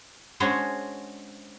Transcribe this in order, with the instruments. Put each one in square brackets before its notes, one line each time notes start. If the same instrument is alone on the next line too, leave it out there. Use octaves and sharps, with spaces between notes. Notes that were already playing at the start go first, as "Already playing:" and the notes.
[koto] G#3 C#4 D4 F#4 C5 C#5